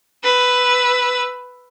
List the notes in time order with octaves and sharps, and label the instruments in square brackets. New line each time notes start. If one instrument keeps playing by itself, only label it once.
[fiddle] B4 E6